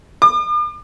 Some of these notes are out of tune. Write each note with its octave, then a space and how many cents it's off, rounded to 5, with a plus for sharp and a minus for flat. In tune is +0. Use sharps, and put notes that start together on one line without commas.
D6 +45